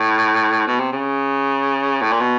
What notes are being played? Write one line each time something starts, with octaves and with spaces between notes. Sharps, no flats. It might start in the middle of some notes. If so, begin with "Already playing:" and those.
Already playing: A2
B2
C3
C#3
A2
A#2
B2